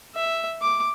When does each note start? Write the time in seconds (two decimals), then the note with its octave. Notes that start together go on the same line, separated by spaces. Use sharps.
0.15 E5
0.62 D6